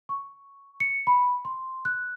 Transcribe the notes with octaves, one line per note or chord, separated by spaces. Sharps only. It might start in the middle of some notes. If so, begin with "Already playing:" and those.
C#6
C#7
B5
C6
F#6